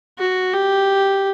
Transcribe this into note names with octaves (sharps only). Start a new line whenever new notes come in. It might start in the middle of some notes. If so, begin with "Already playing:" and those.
F#4
G4